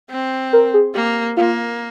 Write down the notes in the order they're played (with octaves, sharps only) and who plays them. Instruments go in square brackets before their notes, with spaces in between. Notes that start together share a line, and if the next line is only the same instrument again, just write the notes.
[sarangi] C4
[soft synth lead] A#4
G#4
[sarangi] A#3 [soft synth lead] G4
[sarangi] A#3 [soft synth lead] F4